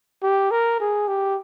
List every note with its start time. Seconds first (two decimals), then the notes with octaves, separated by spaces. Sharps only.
0.23 G4
0.51 A#4
0.80 G#4
1.07 G4